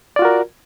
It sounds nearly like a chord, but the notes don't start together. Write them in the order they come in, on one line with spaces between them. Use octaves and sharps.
D5 F4 F#4 A#4